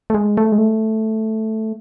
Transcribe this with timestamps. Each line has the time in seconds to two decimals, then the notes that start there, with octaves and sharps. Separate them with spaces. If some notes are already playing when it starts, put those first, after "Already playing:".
0.10 A3
0.14 G#3
0.37 A3
0.52 G#3
0.58 A3